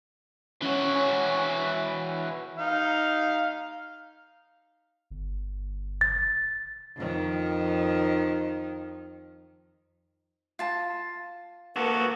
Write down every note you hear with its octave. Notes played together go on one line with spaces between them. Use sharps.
E3 C#4 F#4 C#5
C#5 G#5 C#6
D#4 F5
G1
A6
F2 D#3
F4 A5
A#3 F#4 A4 B4